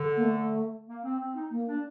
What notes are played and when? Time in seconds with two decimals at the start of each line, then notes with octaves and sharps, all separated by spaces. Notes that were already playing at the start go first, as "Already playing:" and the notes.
Already playing: D3
0.17 A#3
0.23 A3
0.87 A#3
1.04 C4
1.20 C4
1.35 D#4
1.51 A#3
1.67 D4